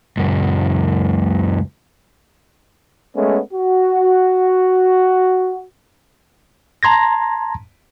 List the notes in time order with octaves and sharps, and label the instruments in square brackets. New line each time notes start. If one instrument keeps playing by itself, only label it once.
[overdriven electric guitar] C#2 F#2
[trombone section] G#3 A3 B3 C#4
F#4
[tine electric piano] A5 A#5 C6 G#6 A#6